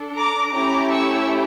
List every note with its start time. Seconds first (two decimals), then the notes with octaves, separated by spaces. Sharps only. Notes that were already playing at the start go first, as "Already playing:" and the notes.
Already playing: D4 A4
0.16 A#5 D6
0.54 A3 C#4 E4 G4 A#5 D6
0.91 C#6 E6